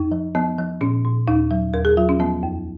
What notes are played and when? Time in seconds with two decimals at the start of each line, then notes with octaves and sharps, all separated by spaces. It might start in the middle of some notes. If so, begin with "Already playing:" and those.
Already playing: F2 D#4
0.11 F3
0.35 F3 B3
0.58 F3
0.81 A#2 C#4
1.05 A#2
1.28 D#2 D#4
1.51 F#3
1.73 D#2 A#4
1.85 G#4
1.97 F#3 F4
2.09 C#4
2.19 F3 B3
2.43 F2